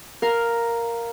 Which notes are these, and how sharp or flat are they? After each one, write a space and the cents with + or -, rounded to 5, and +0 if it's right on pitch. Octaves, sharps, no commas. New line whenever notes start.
A#4 +0 F5 +0